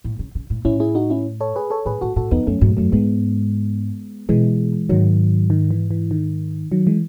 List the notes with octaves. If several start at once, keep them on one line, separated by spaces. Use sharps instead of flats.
A2
C#3
C#3
A2
A2 C#4 E4
E4 G#4
D#4 F#4
C#4 E4
A4 C#5
G#4 B4
A4 C#5
A2 G#4 B4
A2 F#4 A4
A2 F#4 A4
E2 B3 D#4
F#2 A3 C#4
G#2 F#3 A3
F#2 F#3 A3
G#2 G#3 B3
B2 E3 G#3
G#2 D#3 F#3
D#3
E3
E3
D#3
D#3 F#3
E3 G#3